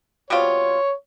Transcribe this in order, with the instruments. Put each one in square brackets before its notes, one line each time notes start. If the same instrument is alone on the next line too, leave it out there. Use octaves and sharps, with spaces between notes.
[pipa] B2 G3 C4 F4 [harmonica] C#5